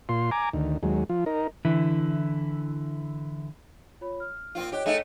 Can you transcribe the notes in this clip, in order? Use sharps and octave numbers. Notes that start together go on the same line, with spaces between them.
A#2 F4 C6
G#5 A#5 D6
D2 D#3
D#2 F#3 G#3
F3 F4
D#4 A#4
D3 E3 E4
F4 C#5 B5
F6
A#2 C4 F4
G4 C#5 D#5 F#6
A3 D#4 G#4